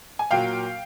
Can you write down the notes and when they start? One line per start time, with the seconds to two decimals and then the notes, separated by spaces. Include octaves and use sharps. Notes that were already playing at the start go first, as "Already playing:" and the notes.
0.19 G#5
0.31 A#2 F#3 A#3 F5 G5